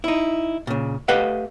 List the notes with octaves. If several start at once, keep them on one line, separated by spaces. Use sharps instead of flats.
D#4 E4
A#2 C#3
A3 G4 B4 D#5 F5 F#5